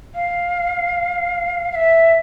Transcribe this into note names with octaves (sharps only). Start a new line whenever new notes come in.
F5
F5
E5